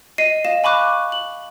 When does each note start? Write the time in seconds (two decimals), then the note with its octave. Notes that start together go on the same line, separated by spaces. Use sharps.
0.18 D#5 C7 D#7
0.45 D#5 F5 E7
0.64 G#5 B5 C#6 D6 F#6
1.12 F#7